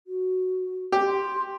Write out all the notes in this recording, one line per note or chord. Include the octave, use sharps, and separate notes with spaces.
F#4
G4
C6